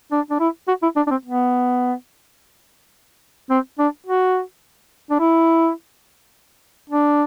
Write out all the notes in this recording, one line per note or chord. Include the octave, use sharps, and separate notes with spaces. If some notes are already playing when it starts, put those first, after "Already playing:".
D4
D4
E4
F#4
E4
D4
D4
C4
B3
C4
D4
F#4
D4
E4
D4